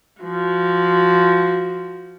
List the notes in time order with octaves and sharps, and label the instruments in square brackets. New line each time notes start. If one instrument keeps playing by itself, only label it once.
[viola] F3 F#4